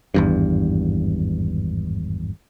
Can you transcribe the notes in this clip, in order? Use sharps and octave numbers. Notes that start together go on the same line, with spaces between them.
G#1 E2 G2